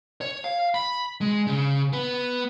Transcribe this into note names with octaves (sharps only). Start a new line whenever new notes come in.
C#5
F5
B5
G#3
C#3
B3